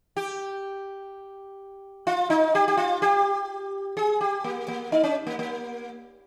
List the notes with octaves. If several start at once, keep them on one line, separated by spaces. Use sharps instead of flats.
G4
F4
D#4
G4
G4
F4
G4
G#4
G4
A#3
A#3
D#4
C#4
A#3
A#3